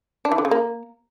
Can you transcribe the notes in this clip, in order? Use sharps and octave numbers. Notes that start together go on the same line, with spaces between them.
D4
E3
D3
C#3
A#3